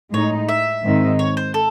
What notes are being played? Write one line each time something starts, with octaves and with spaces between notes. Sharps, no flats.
A2 G#3 D#4 C#5
E5
G#2 D#3 G#3 C4 D#4
C#5
C5
A4